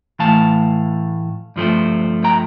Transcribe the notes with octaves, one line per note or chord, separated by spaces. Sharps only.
A2 E3 A3 F5 A5
G2 F3 A3 C4
G5 A#5